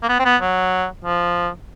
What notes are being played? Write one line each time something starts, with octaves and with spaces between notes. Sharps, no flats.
A#3
B3
C4
B3
F#3
F3